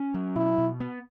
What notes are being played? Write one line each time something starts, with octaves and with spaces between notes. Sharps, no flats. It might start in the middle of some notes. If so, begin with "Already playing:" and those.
Already playing: C#4
F#3
B2 E4
B2
B3